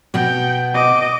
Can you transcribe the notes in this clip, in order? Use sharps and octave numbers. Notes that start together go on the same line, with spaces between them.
B2 B3 F#5 G5
D#5 D6